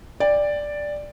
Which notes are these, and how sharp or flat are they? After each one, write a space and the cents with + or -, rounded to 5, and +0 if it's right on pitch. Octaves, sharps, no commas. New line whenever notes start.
D5 +0 G5 +30